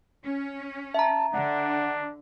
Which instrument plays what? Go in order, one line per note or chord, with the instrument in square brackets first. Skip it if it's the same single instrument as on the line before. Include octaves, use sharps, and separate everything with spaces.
[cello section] C#4
[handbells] E5 A#5 [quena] A5
[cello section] D3 [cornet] D4 [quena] F#5